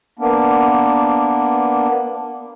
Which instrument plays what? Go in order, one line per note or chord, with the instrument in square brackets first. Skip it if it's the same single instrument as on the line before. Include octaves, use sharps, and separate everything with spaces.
[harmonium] A#3 B3 D4